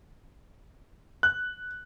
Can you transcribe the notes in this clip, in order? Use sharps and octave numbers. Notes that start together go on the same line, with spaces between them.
F#6